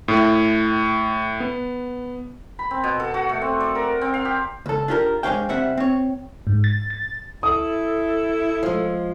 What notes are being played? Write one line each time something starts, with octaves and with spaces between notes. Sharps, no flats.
A2
B3
B5
C4
B2
A4
F#4
A3
C4
D5
A#4
C4
F5
G4
C#2 A4
D4 F4 G4 G#4 A#4
G#3 D4 C5 C#5 F5 G5
C2 G3 C4 C5 E5 F#5
C4 C#5
G#2
A6
A6
E4 A4 D#6
F3 G#3